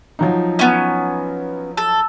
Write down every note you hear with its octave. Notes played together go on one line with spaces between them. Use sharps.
F3 F#3 D#4
B3 C#4
A4